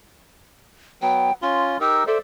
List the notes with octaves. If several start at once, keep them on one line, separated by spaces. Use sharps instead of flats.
F#3 B3 G5
C#4 F4 C6
D#4 G4 A#4 E6
A4 C5 D5 E5